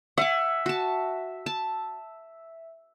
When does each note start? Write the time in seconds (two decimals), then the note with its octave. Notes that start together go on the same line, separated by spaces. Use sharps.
0.18 E5 F#5 G#5 D6
0.66 F#4 A5
1.46 A5